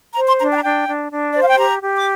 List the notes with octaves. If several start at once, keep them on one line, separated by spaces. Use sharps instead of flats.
C5 A#5
C6
D4 A#5
G5
A#5
D4 G5
D4
D4
C5 D5
F5
G5
G4 A#5
G4
D6